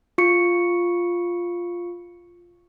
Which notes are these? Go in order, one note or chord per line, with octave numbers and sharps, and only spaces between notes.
F4 C#6 C#7